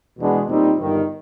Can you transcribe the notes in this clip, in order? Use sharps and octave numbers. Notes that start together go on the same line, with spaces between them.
E2 B2 G#3 B3 D4
A#2 G3 C4 D#4
G1 G2 D#3